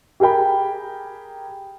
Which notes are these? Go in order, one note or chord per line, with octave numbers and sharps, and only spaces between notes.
G4 G#4 A#4 G5 B5